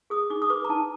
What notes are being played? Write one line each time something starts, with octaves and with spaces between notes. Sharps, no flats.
G#4 D#6
D#4 D6
D#6
B4 D6
A#5
D#4 A5